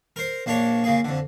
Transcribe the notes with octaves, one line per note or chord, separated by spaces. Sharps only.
A#4 C5
A#1 A#3 D4 C#5 A5
C#3 A#3 G#4
F2 D3